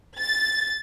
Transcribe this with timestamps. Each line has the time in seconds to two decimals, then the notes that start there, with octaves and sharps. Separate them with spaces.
0.19 A6